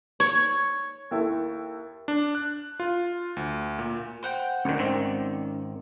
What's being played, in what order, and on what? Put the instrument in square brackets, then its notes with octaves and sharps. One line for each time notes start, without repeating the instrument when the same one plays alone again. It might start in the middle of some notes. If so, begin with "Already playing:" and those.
[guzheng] C#5
[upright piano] D#2 E4 A4
[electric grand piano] D4
F#6
F4
D2
A#2
[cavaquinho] C5 F#5 G5
[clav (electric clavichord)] D2 D#3 [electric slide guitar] C#4 D5
[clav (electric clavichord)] G#1 D#3 C4